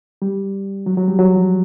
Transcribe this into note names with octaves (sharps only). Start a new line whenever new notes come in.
G3
F#3
F#3
G3
F#3
F3